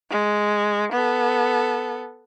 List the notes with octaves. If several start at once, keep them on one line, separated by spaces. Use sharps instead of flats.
G#3
B3 A4